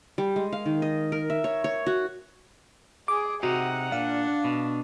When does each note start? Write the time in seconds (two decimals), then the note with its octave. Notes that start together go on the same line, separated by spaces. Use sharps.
0.18 G3
0.36 G#3
0.53 F5
0.65 D#3
0.82 D#5
1.12 A#4
1.30 E5
1.44 C#5
1.64 C#5
1.86 F#4
3.08 G#4 D6
3.43 C3 D#4 F#4 F#5
3.92 A#2 D4 F5
4.44 B2